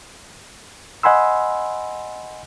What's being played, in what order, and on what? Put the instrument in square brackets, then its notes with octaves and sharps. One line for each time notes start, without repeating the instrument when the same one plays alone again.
[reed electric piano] D#5 F#5 G#5 B5 C6 E6